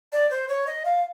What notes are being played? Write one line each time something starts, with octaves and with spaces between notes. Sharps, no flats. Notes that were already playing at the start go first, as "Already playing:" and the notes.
D5
C5
C#5
D#5
F5